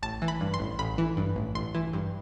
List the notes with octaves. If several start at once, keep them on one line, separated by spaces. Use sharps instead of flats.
A1 A5
E3
B5
G2
C6
A1
A1 B5
E3
G2
A1
A1 C6
E3
G2